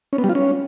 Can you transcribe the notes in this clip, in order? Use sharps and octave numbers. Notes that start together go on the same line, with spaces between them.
C#4
B3
G3
F4
C#4